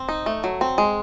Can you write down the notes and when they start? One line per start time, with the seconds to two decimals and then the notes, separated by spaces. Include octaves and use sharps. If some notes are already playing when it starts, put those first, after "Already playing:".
Already playing: C4
0.09 D#4
0.26 A3
0.44 F#3
0.61 C4
0.78 G#3